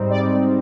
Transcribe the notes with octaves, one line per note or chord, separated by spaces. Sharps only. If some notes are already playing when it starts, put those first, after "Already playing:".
Already playing: G#2 G3 C4 D#4
D5